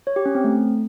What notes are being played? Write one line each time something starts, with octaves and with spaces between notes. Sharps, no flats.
C#5
G4
C#4
C4
A3